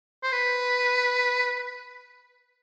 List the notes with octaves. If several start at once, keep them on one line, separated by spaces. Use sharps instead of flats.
C5
B4